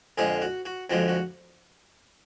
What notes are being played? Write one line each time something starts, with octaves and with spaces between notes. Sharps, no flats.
F2 D3 F3 G#3 G#4
F#4
F#4
F2 D3 F3 G#3 F#4
F#4